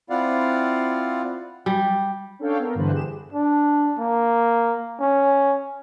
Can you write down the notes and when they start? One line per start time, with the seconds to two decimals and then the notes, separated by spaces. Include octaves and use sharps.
0.10 C4 E4 F4 D5 F5 F#5
1.66 G3
2.39 C#4 D4 A4 C#5 F5 G5
2.59 B3 A#4
2.75 G2 D3 E3 B4 C5 F#6
2.92 G4 G#4 E7
3.33 D4
3.99 A#3
5.00 C#4